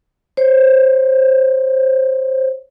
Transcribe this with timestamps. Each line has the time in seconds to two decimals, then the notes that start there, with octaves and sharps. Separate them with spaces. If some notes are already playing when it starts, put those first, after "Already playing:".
0.37 C5 C#5